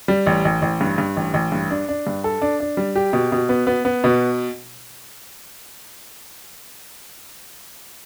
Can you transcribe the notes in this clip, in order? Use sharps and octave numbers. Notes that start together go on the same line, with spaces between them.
G3
A1
A1
A1
G2
G2
A1
A1
G2
D4
D4
G2
A4
D4
D4
G3
G4
B2
B2
B3
B3
B3
B2